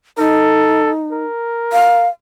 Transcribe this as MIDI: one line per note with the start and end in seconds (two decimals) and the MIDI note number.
0.18 1.24 63
0.18 0.91 69
1.12 2.08 70
1.73 2.08 77